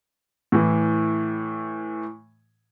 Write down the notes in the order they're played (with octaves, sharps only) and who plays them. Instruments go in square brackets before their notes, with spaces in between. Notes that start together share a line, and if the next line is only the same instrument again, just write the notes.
[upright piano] A2 E3